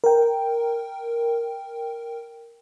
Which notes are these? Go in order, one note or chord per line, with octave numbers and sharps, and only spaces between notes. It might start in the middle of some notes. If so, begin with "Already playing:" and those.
A#4 G5